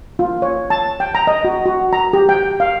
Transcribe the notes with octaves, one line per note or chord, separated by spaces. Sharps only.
F4
C#5
A5
G5
A#5
D#5
F#4
F#4
A#5
G4
G5
F5